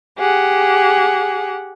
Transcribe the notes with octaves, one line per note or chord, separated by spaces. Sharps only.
G4 G#4 F#5